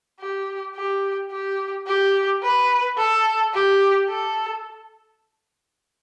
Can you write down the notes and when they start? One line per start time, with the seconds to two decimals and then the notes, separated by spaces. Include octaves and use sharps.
0.20 G4
0.75 G4
1.32 G4
1.87 G4
2.43 B4
2.98 A4
3.54 G4
4.09 A4